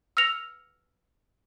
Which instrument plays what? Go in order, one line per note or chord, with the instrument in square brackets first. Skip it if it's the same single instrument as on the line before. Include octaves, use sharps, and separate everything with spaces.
[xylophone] E6 F6 A#6 C#7 F7